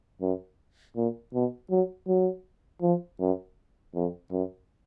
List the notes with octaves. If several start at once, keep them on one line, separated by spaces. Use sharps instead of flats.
F#2
A#2
B2
F#3
F#3
F3
F#2
F2
F#2